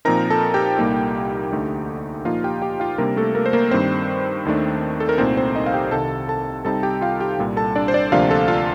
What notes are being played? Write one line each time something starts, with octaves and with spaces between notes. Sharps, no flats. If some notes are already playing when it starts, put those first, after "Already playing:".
A#2 F3 C4 D#4 A#4 A#5
A4 A5
G4 G5
C2 A#2 G3 A#3 D#4
D2 D3 A3 D#4
A#2 F3 A#3 D#4 F4 F5
G4 G5
G4 G5
F4 F5
C3 G3 A#3 D4 A#4
A3 A4
A#3 A#4
C5
A#3 A#4
G2 D#3 G3 C4 C5
D#2 D#3 A3 D4
A4
A#4
C2 A#2 A3 C4 D#4 C5
C4 C5
D#4 D#5
F5
G4 G5
C2 C3 D#3 A4 A5
A4 A5
C3 G3 C4 D#4 A4 A5
G4 G5
F4 F5
G4 G5
C2 A#2 G3
A4 A5
D4 D5
C5
D4 D5
D2 C3 F3 A#3 D4 F4 F5
A4 A5
F4 F5